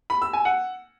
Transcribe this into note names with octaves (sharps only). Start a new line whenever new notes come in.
B5
E6
G#5
F#5